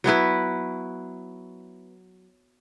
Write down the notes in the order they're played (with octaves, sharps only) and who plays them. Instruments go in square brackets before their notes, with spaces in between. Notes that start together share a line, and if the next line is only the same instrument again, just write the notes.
[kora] F#3 B3 E4 B4